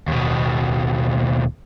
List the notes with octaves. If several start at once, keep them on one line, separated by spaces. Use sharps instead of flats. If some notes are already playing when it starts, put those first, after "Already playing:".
D#2 B2